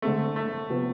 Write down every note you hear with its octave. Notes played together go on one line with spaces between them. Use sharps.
D3 G#3 A3 C4 G#4
A3
C3 F3 B3